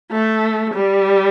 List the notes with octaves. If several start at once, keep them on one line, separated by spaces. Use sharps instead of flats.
A3
G3